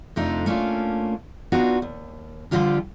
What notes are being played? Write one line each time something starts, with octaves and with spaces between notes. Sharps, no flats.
F2 C3 A3 D4 D#4 F4
A3 A#3 C#4 D4 F4
B3 D4 D#4 F4 F#4
D#2
D3 F3 G3 F4 G4